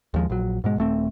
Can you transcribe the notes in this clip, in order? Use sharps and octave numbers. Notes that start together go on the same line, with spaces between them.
D#2 F3 G#3
A#1 F#3
G#2 B2 G#3
D#1 A3 C4